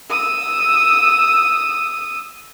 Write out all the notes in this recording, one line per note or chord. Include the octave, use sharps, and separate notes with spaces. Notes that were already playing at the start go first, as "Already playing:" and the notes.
D#6 E6